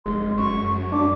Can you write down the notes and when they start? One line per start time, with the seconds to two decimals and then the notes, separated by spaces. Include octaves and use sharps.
0.06 F1 G#3 C6
0.37 F#2 C#6
0.92 D4 D6